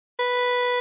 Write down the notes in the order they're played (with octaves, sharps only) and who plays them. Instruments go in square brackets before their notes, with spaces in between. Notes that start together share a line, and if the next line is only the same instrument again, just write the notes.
[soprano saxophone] B4